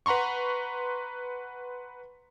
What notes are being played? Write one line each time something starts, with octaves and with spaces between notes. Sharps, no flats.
B4 F#5 A#5 C6 C#6